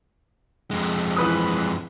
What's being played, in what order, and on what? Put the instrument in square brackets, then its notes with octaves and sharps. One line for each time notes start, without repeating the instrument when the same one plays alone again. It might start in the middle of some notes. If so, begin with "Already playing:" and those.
[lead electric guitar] F2 G#3
[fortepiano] E3 B4 D#6